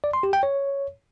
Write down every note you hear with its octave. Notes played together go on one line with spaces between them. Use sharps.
D5
C6
G4
G5
C#5